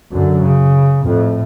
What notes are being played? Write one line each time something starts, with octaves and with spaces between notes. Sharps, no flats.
F#2 D3
C#3
F2 A2